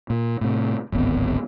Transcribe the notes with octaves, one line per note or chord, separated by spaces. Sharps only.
A#2
A2 C3
D1 G#1 B3 C4